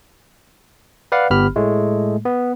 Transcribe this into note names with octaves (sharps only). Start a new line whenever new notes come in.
B4 D5 F5 F#5
G1 B3 G4 B5 F6
A2 G#3 A3
B3